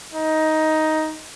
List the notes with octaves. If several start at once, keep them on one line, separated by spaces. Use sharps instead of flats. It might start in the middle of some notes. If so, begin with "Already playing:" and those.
D#4